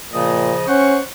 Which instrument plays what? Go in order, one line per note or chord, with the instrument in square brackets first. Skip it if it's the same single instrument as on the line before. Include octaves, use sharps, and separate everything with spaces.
[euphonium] A#2 [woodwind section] C#3 F3 D#5
[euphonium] C#4 [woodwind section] C5 F#5 C#6